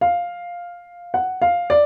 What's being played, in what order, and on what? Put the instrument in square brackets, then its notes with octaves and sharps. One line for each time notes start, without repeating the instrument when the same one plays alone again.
[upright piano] F5
F#5
F5
D5